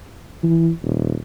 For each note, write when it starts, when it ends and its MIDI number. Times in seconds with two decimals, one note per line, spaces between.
0.43 0.70 52
0.82 1.16 27